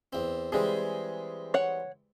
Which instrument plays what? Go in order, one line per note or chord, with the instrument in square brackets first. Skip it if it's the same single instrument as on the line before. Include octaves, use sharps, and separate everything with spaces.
[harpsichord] E2 C4
[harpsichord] E3 G3 C4 [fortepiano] G#3 G#4
[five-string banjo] C#5 F#5